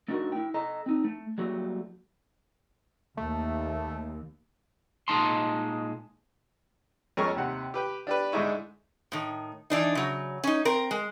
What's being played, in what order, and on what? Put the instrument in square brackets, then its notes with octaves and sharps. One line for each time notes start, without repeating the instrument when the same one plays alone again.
[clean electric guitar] A3 D4 D#4 F4 F#4 A#4
E4 G5
A4 D#5 A#5
C4 D#4
A3
F#3 G3 A3 A#3 F#4
[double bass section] D#2 [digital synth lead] A3
[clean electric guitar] A#2 G#3 A3 D#4 A5 C6
[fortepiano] F2 G#3 A3 C#4 A#4 C#6
D#2 C3 F#5
G4 B4 G5
D4 G4 B4
G#2 D3 G#3 D#4 E4 C#6
[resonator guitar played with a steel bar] A2 D#3
E3 D4 D#4
C#3 F#3
C#4 D#4
C4 A#4
G#3